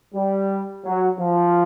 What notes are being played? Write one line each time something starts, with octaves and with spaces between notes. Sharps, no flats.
G3
F#3
F3